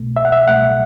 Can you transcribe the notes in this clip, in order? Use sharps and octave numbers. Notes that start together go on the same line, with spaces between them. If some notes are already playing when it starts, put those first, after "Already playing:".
Already playing: C2 B2 A3
E5
F#5
E5
C2 B2 A3 F#5